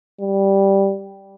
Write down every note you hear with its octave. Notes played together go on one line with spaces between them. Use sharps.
G3